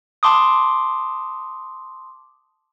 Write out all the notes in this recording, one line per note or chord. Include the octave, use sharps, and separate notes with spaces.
A5 C6 D6 D#6